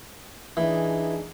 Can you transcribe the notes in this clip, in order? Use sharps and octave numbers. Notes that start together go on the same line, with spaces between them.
E3 D4 D#4 G#4